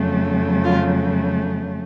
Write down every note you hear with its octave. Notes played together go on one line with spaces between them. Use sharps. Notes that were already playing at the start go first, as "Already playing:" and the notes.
Already playing: F2 C#3 F#3 A3
F4